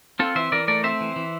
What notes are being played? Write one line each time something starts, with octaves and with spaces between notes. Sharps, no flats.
C4 F4 A4
E3 C5 E5
E3 A#4 D5
A3 A#4 D5
C4 C5 E5
E3
E3